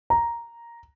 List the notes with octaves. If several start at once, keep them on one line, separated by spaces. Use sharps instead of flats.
A#5